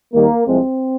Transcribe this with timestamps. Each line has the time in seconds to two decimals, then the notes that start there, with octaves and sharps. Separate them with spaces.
0.13 D#2 D#3 G3 A#3
0.47 C2 C3 F3 G#3 C4